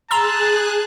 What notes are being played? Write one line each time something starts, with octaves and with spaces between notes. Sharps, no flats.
G#4 A5 A#5 C6 E6 F#6